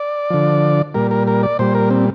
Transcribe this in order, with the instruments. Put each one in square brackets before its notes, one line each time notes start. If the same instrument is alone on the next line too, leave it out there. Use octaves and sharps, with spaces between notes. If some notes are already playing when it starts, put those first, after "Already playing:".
Already playing: [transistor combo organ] D5
D3 F3
A#2 G3 A#4
A#4
A#4
D5
A#2 G3 C5
A#4
C4